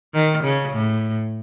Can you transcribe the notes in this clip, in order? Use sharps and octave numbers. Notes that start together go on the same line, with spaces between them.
D#3
C#3
A2